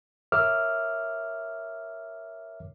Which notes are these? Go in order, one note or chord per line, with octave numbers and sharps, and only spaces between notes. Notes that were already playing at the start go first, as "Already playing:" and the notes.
A#4 C#5 E5 D6 E6 F6